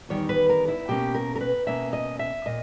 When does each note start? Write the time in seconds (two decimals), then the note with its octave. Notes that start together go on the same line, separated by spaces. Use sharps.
0.09 E2 D#3 G3 C#5
0.29 B4
0.49 A#4
0.68 E4
0.88 B2 A#3 C#4 G4
1.14 A#4
1.36 A#4
1.41 B4
1.67 B2 A#3 C#4 E5
1.93 D#5
2.19 E5
2.46 A#2 D#5